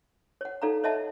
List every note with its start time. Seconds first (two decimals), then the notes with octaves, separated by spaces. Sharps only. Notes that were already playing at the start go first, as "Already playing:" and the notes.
0.41 C#5 F#5
0.62 D#4 A4 D5 F5 F#5 A#5
0.84 C#5 D#5 E5 F#5 A5